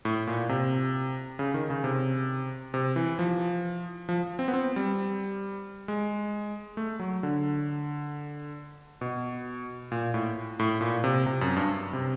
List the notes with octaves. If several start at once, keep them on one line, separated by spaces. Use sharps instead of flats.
A2
A#2
C3
C#3
D#3
C#3
C3
C3
E3
F3
F3
C4
B3
C4
G3
G#3
A3
F#3
D3
B2
A#2
A2
A2
A#2
C3
C3
F#2
G2
C3